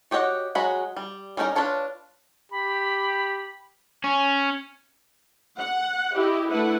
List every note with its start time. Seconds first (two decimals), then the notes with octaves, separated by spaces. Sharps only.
0.11 F#4 G4 C#5 D#5 F#5
0.55 F#3 G#3 F#4 B5
0.97 G3
1.37 G3 C#4 D#4 E4 A#4
1.55 D4 F4 B4 C#5 A5
2.51 G4 B5
4.04 C#4
5.59 F#5
6.14 E4 G4 D#5
6.49 A3 D4 E4 B4 F#5